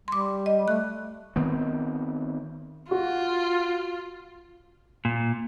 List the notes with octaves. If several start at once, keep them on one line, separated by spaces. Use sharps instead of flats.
G3 C6 D6
D#5
A3 F#6
D#3 B3 C4
F4 F#4
A#2